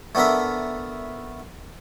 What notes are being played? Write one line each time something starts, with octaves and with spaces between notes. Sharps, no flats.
A3 B3 D4 A#4 E5